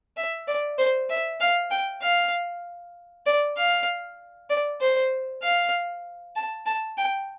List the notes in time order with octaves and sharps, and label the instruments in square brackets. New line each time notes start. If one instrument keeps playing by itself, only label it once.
[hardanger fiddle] E5
D5
C5
E5
F5
G5
F5
D5
F5
D5
C5
F5
A5
A5
G5